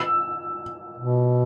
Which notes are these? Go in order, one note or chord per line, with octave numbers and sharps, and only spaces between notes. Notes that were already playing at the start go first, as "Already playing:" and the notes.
Already playing: E6
B2